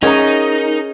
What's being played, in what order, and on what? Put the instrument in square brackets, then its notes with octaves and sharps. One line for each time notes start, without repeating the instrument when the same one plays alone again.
[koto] C#4 [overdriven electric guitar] D#4 [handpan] G#4 D#5 [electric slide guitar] A#4 F#5 A#5